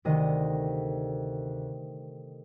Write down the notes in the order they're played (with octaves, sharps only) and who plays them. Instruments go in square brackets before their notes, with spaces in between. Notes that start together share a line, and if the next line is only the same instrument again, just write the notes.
[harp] D2 C3 D#3 D#5